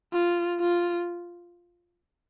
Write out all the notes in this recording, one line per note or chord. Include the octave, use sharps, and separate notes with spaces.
F4
F4